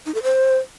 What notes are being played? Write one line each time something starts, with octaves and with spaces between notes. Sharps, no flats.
D#4
A4
C5